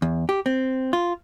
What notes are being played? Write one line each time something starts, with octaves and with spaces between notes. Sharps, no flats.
E2
G4
C4
F4